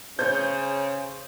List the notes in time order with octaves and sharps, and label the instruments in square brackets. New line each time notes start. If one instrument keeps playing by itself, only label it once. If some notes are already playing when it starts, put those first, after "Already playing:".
[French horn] C#3 [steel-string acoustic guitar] C5 C#5 [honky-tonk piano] G6